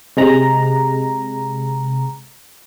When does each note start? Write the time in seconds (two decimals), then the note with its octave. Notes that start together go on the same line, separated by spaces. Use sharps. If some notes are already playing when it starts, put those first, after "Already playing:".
0.17 C3 G#3 A#5